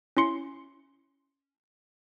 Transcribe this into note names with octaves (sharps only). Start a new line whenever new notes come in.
C#4 E4 C6 C#7